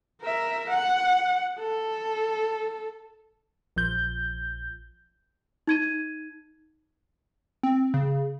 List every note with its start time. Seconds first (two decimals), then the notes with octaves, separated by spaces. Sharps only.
0.22 A#4 E5
0.70 F#5
1.59 A4
3.76 A#1 F3 G6
5.67 D#4 G#6 D#7
7.63 C4
7.94 C#3